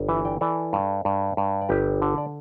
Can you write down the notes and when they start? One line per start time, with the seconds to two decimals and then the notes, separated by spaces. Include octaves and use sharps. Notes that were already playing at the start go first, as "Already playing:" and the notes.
Already playing: G1
0.09 E3 B4 E5
0.25 D5 G5
0.41 E3 A4 D5
0.73 G2
1.05 G2
1.37 G2
1.62 D5
1.69 G1 G4 B4
2.02 D3
2.18 D5